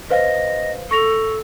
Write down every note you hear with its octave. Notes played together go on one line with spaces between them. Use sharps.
B4 C5 D#5 F5
A4 C#6 A#6 F7